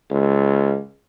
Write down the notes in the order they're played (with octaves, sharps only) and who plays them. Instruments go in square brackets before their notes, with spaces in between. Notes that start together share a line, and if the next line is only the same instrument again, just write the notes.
[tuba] C#2